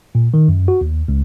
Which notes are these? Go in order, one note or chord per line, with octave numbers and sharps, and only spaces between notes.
A#2
D#3
F#2
F#4
D#2
C#2